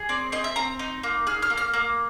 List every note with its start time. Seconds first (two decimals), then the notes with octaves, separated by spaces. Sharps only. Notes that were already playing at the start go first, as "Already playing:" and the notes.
Already playing: G#4
0.09 C4 D5
0.32 C4 D#5
0.44 E5
0.56 C4 A#5
0.79 D#4
1.03 A#3
1.27 G#4 F6
1.42 F6
1.50 A#3
1.57 F6
1.74 A#3